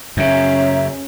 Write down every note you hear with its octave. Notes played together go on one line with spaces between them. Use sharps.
F#2 C#3 C#4 G#4 E5 A#5